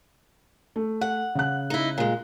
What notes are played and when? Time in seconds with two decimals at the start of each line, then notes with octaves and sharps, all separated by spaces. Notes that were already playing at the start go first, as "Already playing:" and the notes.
0.76 A3
1.01 F#5
1.35 C#3 F#6
1.70 D#4 E4
1.98 A#2 G#3